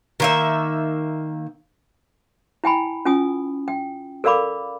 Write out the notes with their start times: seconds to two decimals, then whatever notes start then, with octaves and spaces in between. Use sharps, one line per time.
0.20 D#3 A#3 E5
2.64 E4 G5 G#5 B5
3.05 C#4 F4 G#5 D#6
3.68 G5
4.24 A4 A#4 D5 F5 B5 D6